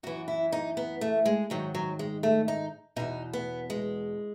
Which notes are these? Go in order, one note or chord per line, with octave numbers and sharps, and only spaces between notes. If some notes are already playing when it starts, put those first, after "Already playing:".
F#2 E3 F#4
E4
D#4
B3
A3
G#3
G#2 D#3 F#3
F#3
G#3
A3
D#4
E2 B2 D#4
B3
G#3